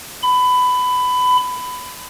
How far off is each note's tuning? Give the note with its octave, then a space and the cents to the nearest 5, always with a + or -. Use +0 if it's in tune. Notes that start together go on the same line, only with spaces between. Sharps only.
B5 +20